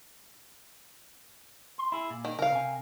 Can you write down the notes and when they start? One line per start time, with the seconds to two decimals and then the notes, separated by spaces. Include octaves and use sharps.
1.78 C6
1.92 E4 G#4
2.10 A#2
2.25 D#3
2.39 C#3 A#4 F5
2.52 C3 G#5